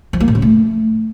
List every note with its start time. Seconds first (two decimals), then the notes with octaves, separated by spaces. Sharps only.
0.13 F3
0.20 A#3
0.28 A2
0.35 C#3
0.42 A3